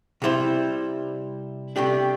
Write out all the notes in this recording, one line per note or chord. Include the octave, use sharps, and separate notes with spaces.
C3 G3 E4 C5
C3 A3 D4 G4